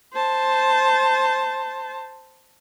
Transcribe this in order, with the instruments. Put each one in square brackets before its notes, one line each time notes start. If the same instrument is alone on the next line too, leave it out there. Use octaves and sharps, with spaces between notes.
[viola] C5 A5